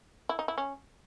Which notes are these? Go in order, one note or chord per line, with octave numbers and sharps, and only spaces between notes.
E4
D#4
E4
C#4